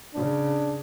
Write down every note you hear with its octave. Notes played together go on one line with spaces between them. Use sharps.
C#3 D4